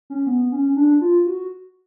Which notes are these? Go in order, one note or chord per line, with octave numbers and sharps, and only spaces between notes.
C#4
B3
C#4
D4
F4
F#4